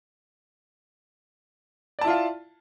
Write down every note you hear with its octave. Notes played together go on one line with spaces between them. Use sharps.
E4 F4 D5 F5 A5